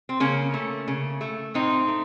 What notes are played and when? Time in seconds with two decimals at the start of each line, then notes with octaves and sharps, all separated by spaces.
0.09 C4
0.20 C#3 A#3 C#4
0.54 A3
0.88 C#3
1.21 A3
1.54 A2 C4 D#4
1.88 A3